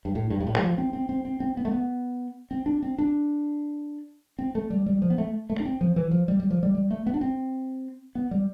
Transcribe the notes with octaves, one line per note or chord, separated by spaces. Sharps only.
G2
A2
G2
G2
A2
G3
F3
C4
C4
C4
C4
C4
B3
A3
B3
C4
D4
C4
D4
C4
A3
G3
G3
F3
B3
A3
A3
D4
C4
F3
E3
F3
G3
G3
F3
G3
G3
A3
B3
D4
C4
B3
G3